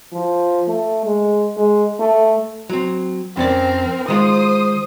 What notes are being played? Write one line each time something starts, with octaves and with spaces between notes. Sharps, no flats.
F3
A3
G#3
G#3
A3
F#3 C4
F2 C4 C#4 A#4 D5
D#3 G#3 F4 C5 D#6